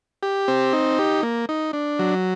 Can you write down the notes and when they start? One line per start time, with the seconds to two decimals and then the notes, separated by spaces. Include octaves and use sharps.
0.23 G4
0.48 C4
0.73 D#4
0.99 G4
1.23 A#3
1.49 D#4
1.73 D4
1.99 F#3